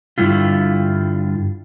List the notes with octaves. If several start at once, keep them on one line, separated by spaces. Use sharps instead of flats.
G2 D3 G3 E4 F4